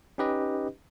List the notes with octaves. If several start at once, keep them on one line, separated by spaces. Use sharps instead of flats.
C#4 D#4 G4 B4 D#5